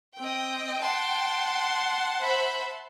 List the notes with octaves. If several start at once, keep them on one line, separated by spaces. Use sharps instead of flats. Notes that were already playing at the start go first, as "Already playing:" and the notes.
C4 D#5 G5
F#5 A5 C6
C5 E5 B5